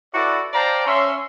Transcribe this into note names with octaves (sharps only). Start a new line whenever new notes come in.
E4 F#4 A4 B4 D5
C5 D5 F5 G5 A5 A#5
C#4 E5 C6